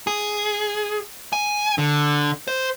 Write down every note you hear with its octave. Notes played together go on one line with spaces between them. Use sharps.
G#4
G#5
D3
C5